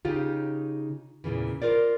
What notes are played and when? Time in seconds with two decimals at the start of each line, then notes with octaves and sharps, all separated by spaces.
0.05 C#3 D#4 F4 G4
1.24 E2 G2 A#2 C#3 E3
1.62 F4 A#4 C5 D5